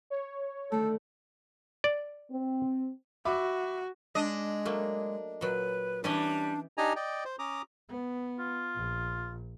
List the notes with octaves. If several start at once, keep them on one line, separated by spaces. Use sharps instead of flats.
C#5
D3 D#3 A3 A4
D5
C4
F#4 E5 B5 D6
G#3 D4 D#5
F#3 A3 A#3
A#2 F#3 B4
E3 G3 C#4 D4 D#5
D4 D#4 G4 D#5 G#5 A#5
D5 D#5 G5
C5
C#4 A#5 D6 D#6
B3
F4
A#1